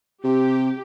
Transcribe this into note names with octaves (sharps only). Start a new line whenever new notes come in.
C3 G4